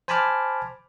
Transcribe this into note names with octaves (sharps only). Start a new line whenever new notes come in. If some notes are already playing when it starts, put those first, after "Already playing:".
C5 G#5 A5 B5 D6 F6